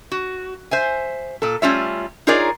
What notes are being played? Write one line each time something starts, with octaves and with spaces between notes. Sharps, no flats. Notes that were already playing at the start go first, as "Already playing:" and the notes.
F#4
C5 E5 G#5
A#2 A4
G3 A3 C#4 F4 C#5 E5
D#4 F4 G#4 A#4 C#5 D5